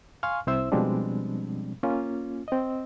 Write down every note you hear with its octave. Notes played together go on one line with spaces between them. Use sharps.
F5 G#5 C6 C#6 F6
C2 C4 E4 C5 E5 E6
B2 F3 G3 G#3 C4 D4
A#3 C#4 F4
C4 D#5